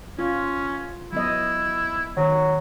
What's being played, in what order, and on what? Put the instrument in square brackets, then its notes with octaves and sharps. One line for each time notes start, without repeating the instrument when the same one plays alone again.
[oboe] C#4 [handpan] F4
[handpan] F#3 B3 D#5 [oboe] E4
[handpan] D#3 F#4 [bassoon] F#3